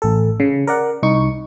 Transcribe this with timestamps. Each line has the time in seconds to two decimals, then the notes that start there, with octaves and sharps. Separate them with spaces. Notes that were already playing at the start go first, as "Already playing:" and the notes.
0.02 A1 A4
0.40 C#3
0.67 A#4 D5 F#5
1.03 C2 D#4 C#6